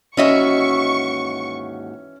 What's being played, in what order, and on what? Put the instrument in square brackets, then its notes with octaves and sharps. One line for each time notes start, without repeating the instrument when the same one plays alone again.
[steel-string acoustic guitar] D#2 G#2 F#4 [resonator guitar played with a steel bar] E3 D#5 E5 [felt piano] C#4 [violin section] C#6